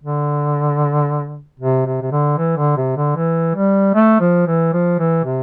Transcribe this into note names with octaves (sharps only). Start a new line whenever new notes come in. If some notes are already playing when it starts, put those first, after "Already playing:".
D3
C3
C3
C3
D3
E3
D3
C3
D3
E3
G3
A3
F3
E3
F3
E3
C3